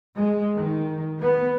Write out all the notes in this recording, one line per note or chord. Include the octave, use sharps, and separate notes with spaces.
G#3
D#3
B3